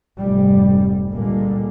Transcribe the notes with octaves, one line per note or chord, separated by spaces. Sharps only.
F1 G#2 G3
C#2 A#2 D3 G3 G#3 A#3